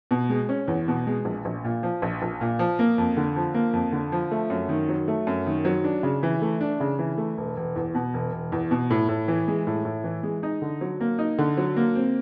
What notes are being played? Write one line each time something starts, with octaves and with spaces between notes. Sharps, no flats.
B2
G#3
C#4
E2
B2
G#3
A#1
A#1
A#2
F3
A#1
A#1
A#2
F3
A#3
F2
D3
F3
A#3
F2
D3
F3
A3
F#2
D#3
F#3
A3
F#2
D#3
F#3
D4
C#3
E3
A3
D4
C#3
E3
A3
E1
E1
E2
B2
E1
E1
E2
B2
A2
A2
E3
G#3
A2
A2
E3
G#3
D#4
D3
F#3
A#3
D#4
D3
F#3
A#3
C4